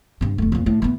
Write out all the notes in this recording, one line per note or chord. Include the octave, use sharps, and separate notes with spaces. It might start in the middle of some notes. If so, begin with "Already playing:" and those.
G2 C4
F1 A3
F2 A#2
A2
E3 B3